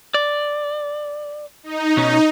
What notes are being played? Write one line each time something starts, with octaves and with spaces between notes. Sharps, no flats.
D5
D#4
B2 C#4 D#4